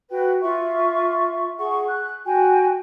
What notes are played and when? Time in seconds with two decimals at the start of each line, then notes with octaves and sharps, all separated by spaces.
0.10 F#4 B4 G5
0.42 F4 E5 C#6
1.58 G#4 F#5 C#6
1.89 F#6
2.25 F#4 G5 G#5